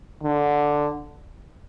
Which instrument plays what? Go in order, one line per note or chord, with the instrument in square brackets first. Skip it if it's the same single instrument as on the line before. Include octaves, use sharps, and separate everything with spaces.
[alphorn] D3